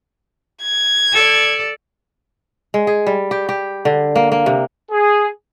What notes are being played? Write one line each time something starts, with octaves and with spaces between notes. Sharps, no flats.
G#6
A4 D5
G#3
G#4
G3
G4
G4
D3
A#3
A#3
C3
G#4